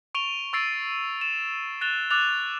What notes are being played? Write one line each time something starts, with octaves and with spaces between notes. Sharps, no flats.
C#6 D7 D#7 F7 G7
C#6 E6 A6 C7 D7
E7
F#6 A6 E7 F7 G7
D6 E6 F#6 A6 F7